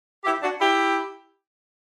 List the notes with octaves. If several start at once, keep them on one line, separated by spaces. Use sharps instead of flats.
E4 G4
D4 F#4
E4 G4